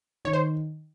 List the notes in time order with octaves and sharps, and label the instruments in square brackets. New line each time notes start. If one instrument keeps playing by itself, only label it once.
[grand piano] D#3 [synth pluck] C#5
[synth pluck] C5